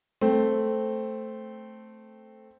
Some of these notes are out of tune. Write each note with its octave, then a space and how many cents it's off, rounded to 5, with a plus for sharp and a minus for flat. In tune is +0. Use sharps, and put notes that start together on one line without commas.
A3 +0 C4 +0